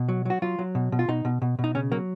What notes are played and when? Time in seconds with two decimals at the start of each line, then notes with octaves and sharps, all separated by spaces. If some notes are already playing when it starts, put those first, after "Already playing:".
Already playing: B2
0.09 F#3
0.25 F#3 F#4
0.42 F#3 F4
0.59 F#3
0.75 B2
0.92 B2
0.99 F4
1.08 B2 D#4
1.25 B2
1.42 B2
1.59 B2
1.64 D#4
1.75 C#3 C#4
1.92 F#3 A#3